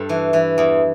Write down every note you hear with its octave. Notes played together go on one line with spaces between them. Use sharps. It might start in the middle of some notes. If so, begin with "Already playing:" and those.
Already playing: G2 A4
E3
E3
E2